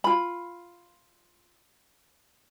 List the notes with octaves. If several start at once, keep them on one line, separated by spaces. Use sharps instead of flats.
F4 B5